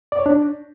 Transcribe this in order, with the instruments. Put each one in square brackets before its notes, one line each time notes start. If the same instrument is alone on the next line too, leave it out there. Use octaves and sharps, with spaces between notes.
[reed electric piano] D5
C#5
D4